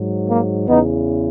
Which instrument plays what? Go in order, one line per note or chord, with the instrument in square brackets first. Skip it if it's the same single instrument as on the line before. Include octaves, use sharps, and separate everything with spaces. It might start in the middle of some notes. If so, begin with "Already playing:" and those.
Already playing: [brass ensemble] G#2 F#3
A#3
E2 C#3 E3 B3 D#4